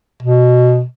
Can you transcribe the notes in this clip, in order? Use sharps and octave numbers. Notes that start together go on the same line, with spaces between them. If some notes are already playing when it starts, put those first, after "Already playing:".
B2